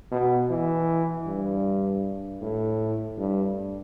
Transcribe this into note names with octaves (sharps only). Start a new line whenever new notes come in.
B2
E3
G2
A2
G2